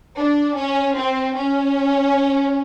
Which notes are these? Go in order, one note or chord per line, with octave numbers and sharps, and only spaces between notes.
D4
C#4
C4
C#4